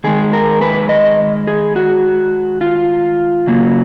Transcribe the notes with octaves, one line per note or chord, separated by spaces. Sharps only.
D#3 G#3 G#4
A#4
B4
D#5
G#4
F#4
F4
C#3 F#3 A#3